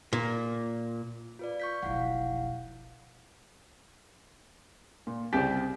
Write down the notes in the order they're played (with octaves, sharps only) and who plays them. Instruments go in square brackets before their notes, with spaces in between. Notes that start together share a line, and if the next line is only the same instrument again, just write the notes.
[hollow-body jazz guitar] A#2
[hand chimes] F4 B4 D5
C#6 G6 B6
[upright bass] F1 B1 [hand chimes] E4 F5 F#5
[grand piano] A#2
[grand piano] C2 C#3 B6 [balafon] C4 [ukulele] G4 C5